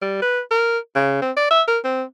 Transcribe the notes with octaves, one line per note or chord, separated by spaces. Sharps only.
G3
B4
A#4
C#3
C4
D5
E5
A#4
C4